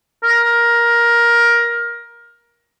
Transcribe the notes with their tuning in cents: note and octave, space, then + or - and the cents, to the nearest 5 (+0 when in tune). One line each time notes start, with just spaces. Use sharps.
A#4 +15